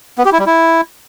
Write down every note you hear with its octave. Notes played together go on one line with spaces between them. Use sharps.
B3
G4
E4
G3
E4